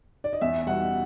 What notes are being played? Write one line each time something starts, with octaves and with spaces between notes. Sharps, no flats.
D5
D#5
E2 E5
B2 G3 F#5